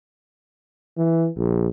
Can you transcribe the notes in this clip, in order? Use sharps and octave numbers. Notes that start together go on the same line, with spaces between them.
E3
A#1